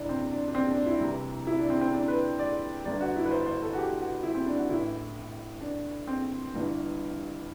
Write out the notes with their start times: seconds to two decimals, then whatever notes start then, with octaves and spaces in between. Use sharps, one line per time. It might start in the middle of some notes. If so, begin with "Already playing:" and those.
Already playing: F#1 C3 D4 E4
0.09 C4
0.32 D4
0.48 D4
0.54 C4
0.71 D4
0.86 E4
1.01 C2 C3 E3
1.47 E4
1.58 D4
1.70 C4
1.81 C4
1.93 D4
2.08 B4
2.39 D5
2.85 G1 G2 D3 D5
3.00 F#4
3.16 E4
3.25 B4
3.31 C5
3.46 C5
3.62 A4
3.73 F#4
3.78 G4
4.00 F#4
4.23 E4
4.34 C4
4.46 D4
4.58 F#4
4.69 A1 A2 E3 E4
5.61 D4
6.07 C4
6.54 G1 G2 E3